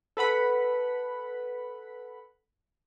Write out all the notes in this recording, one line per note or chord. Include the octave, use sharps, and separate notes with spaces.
A4 B4 F#5 B5